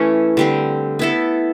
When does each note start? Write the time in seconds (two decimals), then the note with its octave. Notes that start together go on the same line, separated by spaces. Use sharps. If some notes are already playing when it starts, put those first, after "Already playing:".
Already playing: E3 A3 C#4 E4
0.37 D3 G3 C4
0.99 B3 E4 A4